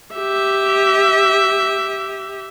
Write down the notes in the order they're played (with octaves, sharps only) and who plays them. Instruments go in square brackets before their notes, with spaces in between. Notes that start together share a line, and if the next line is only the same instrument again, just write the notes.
[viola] G4 E5